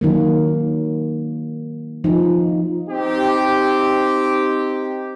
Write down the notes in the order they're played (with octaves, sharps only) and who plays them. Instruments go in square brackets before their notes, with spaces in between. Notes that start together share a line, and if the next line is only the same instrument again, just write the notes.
[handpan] D#3 F#3 A#3
F3 D#4
[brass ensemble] C4 D#4 G4